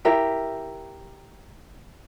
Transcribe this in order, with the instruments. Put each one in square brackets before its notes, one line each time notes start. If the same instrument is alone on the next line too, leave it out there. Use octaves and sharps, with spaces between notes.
[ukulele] E4 G4 A#4 E5